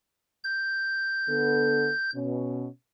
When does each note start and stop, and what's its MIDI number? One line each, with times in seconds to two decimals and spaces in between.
0.44 2.10 91
1.28 1.90 50
1.28 1.90 59
1.28 1.90 69
2.15 2.67 47
2.15 2.67 61